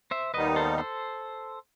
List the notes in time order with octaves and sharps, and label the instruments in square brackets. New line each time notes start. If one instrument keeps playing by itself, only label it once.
[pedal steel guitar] C5 E5
[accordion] D#2 D#3 G3 B3 D#4 [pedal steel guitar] B4 D#5
[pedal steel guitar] A4 C5
A4 C5